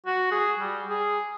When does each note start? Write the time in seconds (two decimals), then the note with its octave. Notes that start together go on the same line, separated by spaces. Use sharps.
0.06 F#4
0.32 G#4
0.60 G3
0.90 G#4